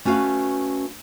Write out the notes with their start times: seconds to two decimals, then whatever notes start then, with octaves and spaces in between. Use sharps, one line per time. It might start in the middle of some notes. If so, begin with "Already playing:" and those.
0.05 A3 C#4 F#4 B4 F5